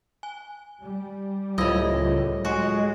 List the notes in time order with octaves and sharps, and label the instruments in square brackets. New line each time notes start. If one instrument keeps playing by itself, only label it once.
[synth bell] G#5
[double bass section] G3
[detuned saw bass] C#2 [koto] A2 D#5 [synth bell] F#3 F4
[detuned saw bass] G#3 [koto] F#4